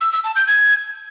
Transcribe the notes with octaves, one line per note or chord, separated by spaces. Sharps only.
E6
E6
A5
G6
G#6